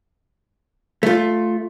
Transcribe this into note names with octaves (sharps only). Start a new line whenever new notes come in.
A3 F4